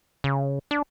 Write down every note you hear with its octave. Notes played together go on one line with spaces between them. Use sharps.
C#3
D4